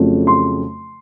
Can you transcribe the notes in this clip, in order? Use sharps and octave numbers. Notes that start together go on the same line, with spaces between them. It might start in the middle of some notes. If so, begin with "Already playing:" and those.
Already playing: F2 C#3 F#3 A3 C4
C6